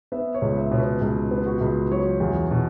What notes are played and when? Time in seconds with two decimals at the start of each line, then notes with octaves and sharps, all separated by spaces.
0.12 B3 E5
0.34 C#5
0.42 C#2
0.57 E5
0.71 B2 C#5
0.79 B4
1.01 C#2
1.31 B3
1.46 F#4
1.61 C#2
1.91 F#3 C#5
2.20 E2
2.51 B2